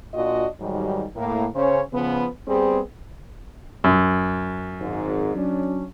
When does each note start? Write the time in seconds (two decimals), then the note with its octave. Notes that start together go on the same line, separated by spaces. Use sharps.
0.14 A#2 D4 F4 F#4 D#5
0.59 G#2 D#3 F#3 G3
1.16 A2 A#3
1.55 C#3 C#4 C5 C#5
1.92 C#3 F3 B3
2.47 G3 B3 C4 G#4
3.84 F#2
4.80 G#1 G#2
5.36 F#3 C#4 D4